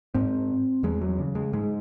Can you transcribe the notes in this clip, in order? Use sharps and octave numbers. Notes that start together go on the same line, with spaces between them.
G#2 C4
E2 G#3
F#3
C#3
G#3
G#2 G#3